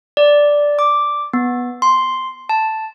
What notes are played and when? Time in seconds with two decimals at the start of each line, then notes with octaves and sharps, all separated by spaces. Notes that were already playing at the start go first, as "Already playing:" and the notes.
0.17 D5
0.79 D6
1.33 B3
1.82 C6
2.49 A5